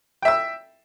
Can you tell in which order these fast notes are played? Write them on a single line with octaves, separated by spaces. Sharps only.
G5 E5 E6